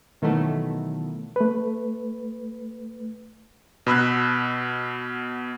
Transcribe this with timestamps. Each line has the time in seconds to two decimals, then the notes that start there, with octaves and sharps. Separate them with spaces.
0.22 B2 D#3 E3 F#3 A3 B3
1.36 A3 B4
3.87 B2 B5 E6 F#6